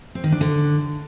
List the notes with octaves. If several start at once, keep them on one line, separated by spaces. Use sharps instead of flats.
C4
D#3
D4
D3